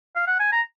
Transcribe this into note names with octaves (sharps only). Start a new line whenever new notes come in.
F5
F#5
G#5
A#5